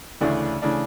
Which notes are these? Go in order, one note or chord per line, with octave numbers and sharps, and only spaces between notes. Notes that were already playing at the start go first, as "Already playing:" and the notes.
D2 C#3 E3 A3 D4
C#3 E3 A3 D4